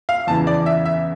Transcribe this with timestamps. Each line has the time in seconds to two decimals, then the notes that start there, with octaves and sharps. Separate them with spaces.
0.09 F5
0.27 E2 C#3 E3 A5
0.47 D5
0.66 E5
0.86 E5